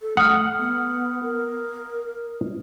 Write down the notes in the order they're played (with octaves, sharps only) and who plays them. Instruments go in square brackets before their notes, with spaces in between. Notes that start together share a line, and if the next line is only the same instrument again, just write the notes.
[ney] A4
[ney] A3 [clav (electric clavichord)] F#5 [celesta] D#6 F6
[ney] B3
A#4